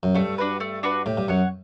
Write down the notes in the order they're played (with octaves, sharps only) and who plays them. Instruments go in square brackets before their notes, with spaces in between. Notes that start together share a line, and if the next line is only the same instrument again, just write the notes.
[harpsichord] F#2
[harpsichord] G2 [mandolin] A3
[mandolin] D4 F#4 B4
A3
D4 F#4 B4
[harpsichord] A2 [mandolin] G4
[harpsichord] G2
[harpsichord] F#2 [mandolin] C#5 F#5